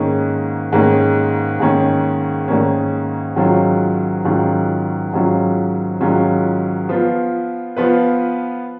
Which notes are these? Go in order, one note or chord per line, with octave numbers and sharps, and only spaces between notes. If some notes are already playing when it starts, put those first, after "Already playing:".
Already playing: G#2 D#3 A#3 C#4
G#2 D#3 A#3 C#4
G#2 D#3 A#3 C#4
G#2 D#3 A#3 C#4
G#2 D#3 F#3 C#4 F4
G#2 D#3 F#3 C#4 F4
G#2 D#3 F#3 C#4 F4
G#2 D#3 F#3 C#4 F4
F3 B3 F4 B4
F3 B3 F4 B4